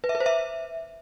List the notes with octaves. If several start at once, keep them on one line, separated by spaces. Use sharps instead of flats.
B4
E5
B4
C5
E5